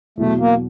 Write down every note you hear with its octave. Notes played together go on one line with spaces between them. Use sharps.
E2 B2 F#3 A3
A#3